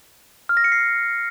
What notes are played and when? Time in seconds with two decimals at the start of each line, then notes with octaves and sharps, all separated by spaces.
0.49 F6
0.57 A#6
0.64 C#7
0.72 C7